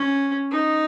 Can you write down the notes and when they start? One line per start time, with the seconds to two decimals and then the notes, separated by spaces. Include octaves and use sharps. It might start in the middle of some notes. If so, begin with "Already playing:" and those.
Already playing: C#4
0.51 D#4